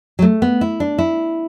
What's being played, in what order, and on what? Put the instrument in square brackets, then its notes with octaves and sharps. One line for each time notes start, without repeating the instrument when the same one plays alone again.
[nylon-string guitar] F#3
A3
B3
E4
D4
E4